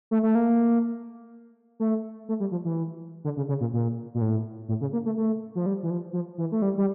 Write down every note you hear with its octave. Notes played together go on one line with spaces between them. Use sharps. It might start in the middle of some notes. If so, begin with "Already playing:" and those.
A3
A3
A#3
A3
A3
G3
F3
E3
D3
C#3
C#3
A#2
A#2
A#2
A2
A2
C#3
A#3
A3
A3
F3
G3
E3
F3
F3
E3
A3
G3
G3